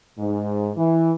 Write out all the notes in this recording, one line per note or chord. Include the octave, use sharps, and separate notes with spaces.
G#2
E3